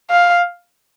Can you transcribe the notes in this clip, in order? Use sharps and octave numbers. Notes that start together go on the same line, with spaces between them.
F5